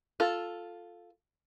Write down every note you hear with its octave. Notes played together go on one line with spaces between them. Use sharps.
F4 A4